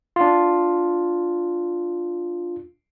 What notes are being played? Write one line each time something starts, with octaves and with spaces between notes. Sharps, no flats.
D4 F4